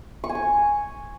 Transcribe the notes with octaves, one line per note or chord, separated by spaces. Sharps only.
C#6
G#5
C#6